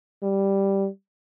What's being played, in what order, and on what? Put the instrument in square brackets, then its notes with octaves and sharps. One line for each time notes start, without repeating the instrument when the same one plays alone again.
[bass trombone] G3